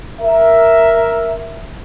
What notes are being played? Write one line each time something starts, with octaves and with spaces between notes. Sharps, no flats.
A#4 E5